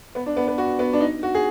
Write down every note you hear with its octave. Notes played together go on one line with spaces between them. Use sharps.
B3
D4
B3
B3
F#4
B3
D4
D#4
F#4
G#4